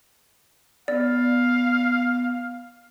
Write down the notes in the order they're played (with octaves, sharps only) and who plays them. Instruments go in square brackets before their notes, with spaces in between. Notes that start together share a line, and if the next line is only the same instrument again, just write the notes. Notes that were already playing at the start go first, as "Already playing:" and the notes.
[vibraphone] B3 [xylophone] D5 [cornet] F5